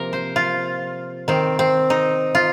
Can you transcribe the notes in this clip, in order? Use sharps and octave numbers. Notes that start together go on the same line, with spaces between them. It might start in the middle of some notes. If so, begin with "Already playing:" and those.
Already playing: C3 F3 A#3 A#4
C5
F4
D#3 C4
C4
D#4
F4